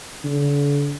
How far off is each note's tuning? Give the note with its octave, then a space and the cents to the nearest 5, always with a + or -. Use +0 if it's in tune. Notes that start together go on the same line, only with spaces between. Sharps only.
D3 -40